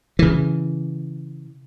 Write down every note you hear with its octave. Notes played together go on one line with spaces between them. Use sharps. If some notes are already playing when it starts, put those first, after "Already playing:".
C#3 E3